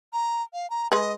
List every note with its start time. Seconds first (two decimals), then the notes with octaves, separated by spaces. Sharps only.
0.13 A#5
0.53 F5
0.70 A#5
0.92 G#3 B4 D#5